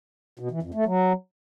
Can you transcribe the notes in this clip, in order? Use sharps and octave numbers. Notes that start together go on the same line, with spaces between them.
B2
E3
F2
A3
F#3